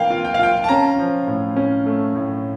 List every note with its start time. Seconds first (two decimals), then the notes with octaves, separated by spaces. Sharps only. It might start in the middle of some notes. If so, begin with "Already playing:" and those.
Already playing: E3 A#3 F5 G5
0.10 F4
0.24 G5
0.34 F5
0.39 F4 G5
0.64 A5
0.68 C#4 A#5
0.99 F3
1.27 A2
1.56 C#4
1.86 A3
2.15 A2